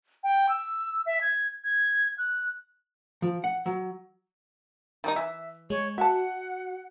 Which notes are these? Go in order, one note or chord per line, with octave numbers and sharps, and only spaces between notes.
G5
E6
E5
G#6
G#6
F#6
F3
F#5
F#3
D#3 G3 D#4
E3 E5
G#3 C#5
F#4 E5 F#5 A5